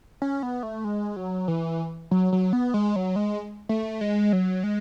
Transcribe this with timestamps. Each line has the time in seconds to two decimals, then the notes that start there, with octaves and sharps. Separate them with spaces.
0.22 C#4
0.43 B3
0.63 A3
0.84 G#3
1.16 F#3
1.48 E3
2.11 F#3
2.33 F#3
2.53 B3
2.74 G#3
2.96 F#3
3.16 G#3
3.69 A3
4.01 G#3
4.33 F#3
4.64 G#3